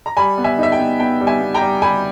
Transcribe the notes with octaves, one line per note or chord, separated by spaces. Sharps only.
A#5
G3 G#5 B5
B3
E5 G#5
D#4 E5
G5
B3
B3 G5
G3
E5 G#5
B3
G5 A#5
G3
G3 G#5 B5